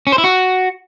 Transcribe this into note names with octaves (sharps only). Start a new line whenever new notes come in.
C#4
C5
E4
F#4